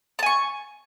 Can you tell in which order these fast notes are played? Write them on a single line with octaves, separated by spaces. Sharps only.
A5 G#5 C#6